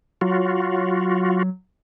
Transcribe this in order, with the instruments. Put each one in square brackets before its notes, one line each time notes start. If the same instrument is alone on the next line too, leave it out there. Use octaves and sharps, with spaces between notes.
[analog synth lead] F#3 [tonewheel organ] F4 F#4